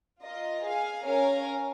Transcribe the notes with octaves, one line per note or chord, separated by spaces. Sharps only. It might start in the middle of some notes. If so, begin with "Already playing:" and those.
F4 A#4 D#5
G#4 F5 G#5
C#4 A#4 C#5 F5 G#5